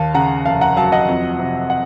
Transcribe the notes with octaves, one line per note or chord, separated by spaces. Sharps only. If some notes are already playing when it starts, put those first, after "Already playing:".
Already playing: D#2 F5 A5
C#3 F#5 A#5
F1 F5 A5
F#5 A#5
F#3 F5 A5
D#5 F#5
F2
C3
F#5